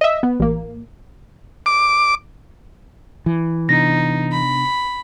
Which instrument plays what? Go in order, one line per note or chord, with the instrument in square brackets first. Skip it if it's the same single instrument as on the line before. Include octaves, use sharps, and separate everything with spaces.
[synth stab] D#5 E5
B3
A1 A#3
[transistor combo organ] D6
[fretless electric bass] E3
[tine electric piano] C3 B3 D4 [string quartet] D#4 [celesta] A#6
[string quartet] B5